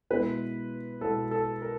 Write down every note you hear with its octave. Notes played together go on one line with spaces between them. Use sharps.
B2 G#3 B3 E4 B4
B2 G#3 B3 E4 A4
A4
A#4